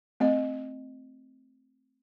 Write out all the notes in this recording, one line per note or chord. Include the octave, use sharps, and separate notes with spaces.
A3 C4 D#5